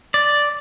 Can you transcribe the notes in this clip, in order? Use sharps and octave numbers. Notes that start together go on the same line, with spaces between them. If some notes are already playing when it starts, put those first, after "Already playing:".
D5